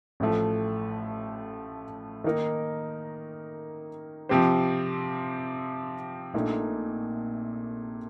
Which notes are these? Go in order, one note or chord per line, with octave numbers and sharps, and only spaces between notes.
A1 A2 F3 A3
D#3 A#3 D#4 A#4
C3 F3 C4 G4 C5
A#1 A#2 A3 D#4